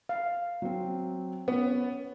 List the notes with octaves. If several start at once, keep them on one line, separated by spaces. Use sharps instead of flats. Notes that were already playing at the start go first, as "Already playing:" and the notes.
F5
F#3 C4
B3 C#4 C#5